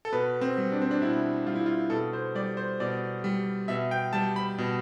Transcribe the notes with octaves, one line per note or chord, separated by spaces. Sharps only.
A4
B2 B4
C4
G3
D4
C4
D4
B2 E4
G3 F4
E4
F4
B2 A4
C5
G3 D5
C5
B2 D5
G3
B2 E5
G5
G3 A5
B5
B2